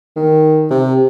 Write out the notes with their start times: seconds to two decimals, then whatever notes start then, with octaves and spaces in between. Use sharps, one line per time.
0.16 D#3
0.70 C3